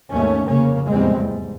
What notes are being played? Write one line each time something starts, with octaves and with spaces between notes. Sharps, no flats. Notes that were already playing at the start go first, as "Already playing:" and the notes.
G#1 D#2 A3 C#4
F1 C#3 A#3 C#4
F1 E2 A2 G3 G#3 C4
G#2